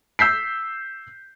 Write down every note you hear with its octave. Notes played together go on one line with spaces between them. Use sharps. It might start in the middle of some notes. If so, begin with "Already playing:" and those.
E6 G6 B6 C7